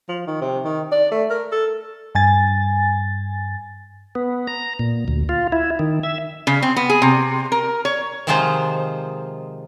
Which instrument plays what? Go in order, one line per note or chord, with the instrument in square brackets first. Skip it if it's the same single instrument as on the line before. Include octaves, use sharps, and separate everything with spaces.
[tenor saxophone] F3
D#3
C3
D#3
D5
A3
A#4
A4
[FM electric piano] G2 G#5 A6
[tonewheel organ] B3
A#5
A#2
D2
F4
E4
D#3
E5
[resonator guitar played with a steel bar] C#3
C4
B3
G#4
C3
A#4
C#5
[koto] C3 D#3 F3 G#3 F4 C5